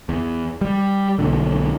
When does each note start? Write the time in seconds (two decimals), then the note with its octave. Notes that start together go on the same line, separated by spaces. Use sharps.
0.09 E2
0.61 G3
1.18 B1 A#2 D3